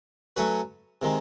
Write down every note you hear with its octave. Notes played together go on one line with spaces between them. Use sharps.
F#3 A3 C#4 F#4 B4
C3 D#3 G#3